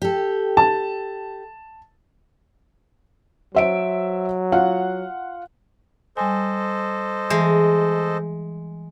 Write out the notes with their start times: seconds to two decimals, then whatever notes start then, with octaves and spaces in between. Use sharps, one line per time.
0.02 G4 A4
0.57 A5
3.55 F#3 C5 E5 D7
4.52 F4 F5 F#5
6.17 G3 A4 C5 D#5 G#5
7.30 E3 G#3